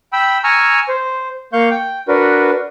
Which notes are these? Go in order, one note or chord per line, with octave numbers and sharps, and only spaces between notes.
G5 B5 E6
G#5 A#5 C#6 E6 F6
C5
A#3 F5 C#6 G6
G5
D4 F#4 A#4 B4